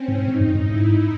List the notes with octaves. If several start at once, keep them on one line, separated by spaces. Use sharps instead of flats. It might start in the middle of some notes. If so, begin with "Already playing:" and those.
Already playing: C4 C#4
G#2
G#2 D#4
F#2
G#2
E4